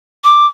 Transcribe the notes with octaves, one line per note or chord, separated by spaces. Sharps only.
D6